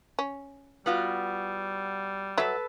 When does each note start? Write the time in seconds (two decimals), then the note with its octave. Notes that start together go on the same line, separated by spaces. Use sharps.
0.19 C#4
0.86 G3 B3 F4 F#4
2.38 F#3 A4 B4 E5